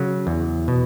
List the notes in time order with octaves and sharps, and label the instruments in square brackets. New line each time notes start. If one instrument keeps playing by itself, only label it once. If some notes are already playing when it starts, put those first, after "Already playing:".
Already playing: [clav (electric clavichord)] C#3 F#3
E2
B2